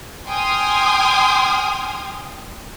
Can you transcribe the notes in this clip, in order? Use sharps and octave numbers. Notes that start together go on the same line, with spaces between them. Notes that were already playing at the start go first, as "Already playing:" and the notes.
G5 G#5 C6 D#6 F6